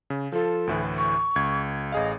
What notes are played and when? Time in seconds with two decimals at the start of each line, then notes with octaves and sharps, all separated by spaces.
0.10 C#3
0.32 F3 F4 A4
0.67 D2 A2 E3
0.97 C#6
1.36 C#2 G#6
1.92 A1 G#4 D#5 F5